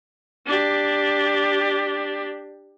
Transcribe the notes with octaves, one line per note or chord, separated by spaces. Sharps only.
D4 G4